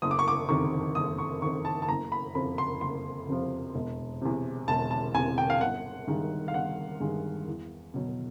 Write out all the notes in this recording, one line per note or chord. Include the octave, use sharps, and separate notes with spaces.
F#1 D#6
D6
C#6
D6
F2 C3 D#3 C#6
F#1 D#6
C#6
F2 C3 D#3 C#6
A5
A5
F#1 A#5
B5
F2 C3 F3 B5
C6
F#1 C6
F2 C3 F3
E1
E2 C3
E1 A5
A5
E2 C3 G#5
G5
F5
G1 F#5
G2 D#3 G#3
F5
G1 F#5
G2 D#3 G#3
E2
B2 F#3